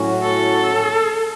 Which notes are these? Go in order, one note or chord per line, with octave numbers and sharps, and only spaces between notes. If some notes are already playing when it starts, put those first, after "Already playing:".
Already playing: A2 F#3 C#4 F#4
A4